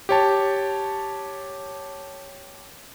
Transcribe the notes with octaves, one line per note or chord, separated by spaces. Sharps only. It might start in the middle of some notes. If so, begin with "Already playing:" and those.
G4 C#5 A5